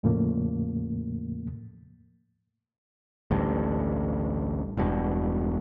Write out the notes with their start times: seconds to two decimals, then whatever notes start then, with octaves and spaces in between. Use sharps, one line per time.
0.03 E2 A2 C#3 F3 A3 A#3
3.31 A1 D2 G2
4.77 E1 G2 B2